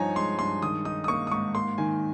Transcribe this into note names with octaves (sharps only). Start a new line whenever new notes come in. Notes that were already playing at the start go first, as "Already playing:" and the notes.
Already playing: G2 F3 D#4 C#5 G#5 A#5
G#3 C6
G2 C6
D#3 D#6
D#4 D#6
D#6
A#3 C#6
D#6
G#2 C#6
A#3 C6
D#3 G#5